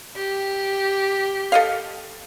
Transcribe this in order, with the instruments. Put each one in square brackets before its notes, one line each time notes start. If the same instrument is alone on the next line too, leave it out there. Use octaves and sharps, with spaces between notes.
[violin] G4
[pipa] A4 D#5 F5